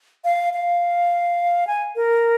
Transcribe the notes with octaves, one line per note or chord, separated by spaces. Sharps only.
F5
F5
G#5
A#4